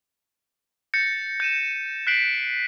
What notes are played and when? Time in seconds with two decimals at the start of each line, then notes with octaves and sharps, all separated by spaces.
0.94 G6 A6 A#6 C#7
1.40 G6 D#7 E7
2.07 F#6 G6 B6 C7 D7 F#7